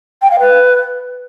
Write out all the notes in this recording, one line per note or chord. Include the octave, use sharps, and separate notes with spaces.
G5
F5
B4